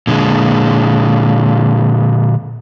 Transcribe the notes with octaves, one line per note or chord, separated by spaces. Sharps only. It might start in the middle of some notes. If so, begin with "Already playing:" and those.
A#2 D3 G3 G#3